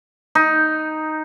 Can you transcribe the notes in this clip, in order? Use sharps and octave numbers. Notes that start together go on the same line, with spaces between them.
D#4